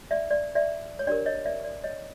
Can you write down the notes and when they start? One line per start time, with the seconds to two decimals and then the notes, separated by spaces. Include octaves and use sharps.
0.11 D5 E5
0.31 D5
0.55 D5 E5
0.99 C#5
1.07 D4 G4 A#4 D5
1.26 C#5 D#5
1.46 D5 E5
1.64 D5
1.84 C#5 D#5